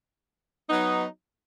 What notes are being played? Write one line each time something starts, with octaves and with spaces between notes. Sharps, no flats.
F#3 B3 D#4